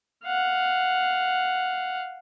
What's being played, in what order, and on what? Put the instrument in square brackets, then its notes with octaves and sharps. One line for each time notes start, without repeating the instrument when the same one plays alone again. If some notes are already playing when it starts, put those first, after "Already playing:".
[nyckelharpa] F5 F#5